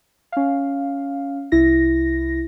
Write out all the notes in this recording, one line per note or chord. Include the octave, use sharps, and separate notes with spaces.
C#4 F5
C2 E4 A#6